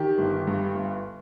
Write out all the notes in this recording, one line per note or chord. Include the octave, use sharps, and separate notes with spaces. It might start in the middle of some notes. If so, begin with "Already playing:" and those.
Already playing: D#3 G4
G1
G2
G1